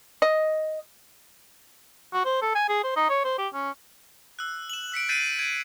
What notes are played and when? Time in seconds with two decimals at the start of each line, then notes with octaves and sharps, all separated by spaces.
0.22 D#5
2.14 F#4
2.25 C5
2.42 A4
2.55 G#5
2.69 G#4
2.84 C5
2.96 D#4
3.09 C#5
3.24 C5
3.38 G4
3.54 C#4
4.39 E6 F#6
4.70 E7 F#7
4.92 E6 B6 C#7 D7
5.09 G6 A6 B6 C7 D#7 E7
5.39 G#6 D7 D#7